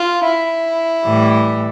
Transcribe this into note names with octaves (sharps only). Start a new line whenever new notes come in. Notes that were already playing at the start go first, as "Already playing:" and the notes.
Already playing: F4
E4
A2 E3 G3